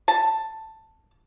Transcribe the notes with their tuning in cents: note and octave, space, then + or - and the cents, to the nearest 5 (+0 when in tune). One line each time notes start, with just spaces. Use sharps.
A5 +10